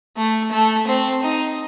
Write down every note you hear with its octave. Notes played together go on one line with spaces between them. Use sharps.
A3
A3
C4
D#4